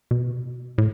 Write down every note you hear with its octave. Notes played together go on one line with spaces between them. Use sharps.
B2
A2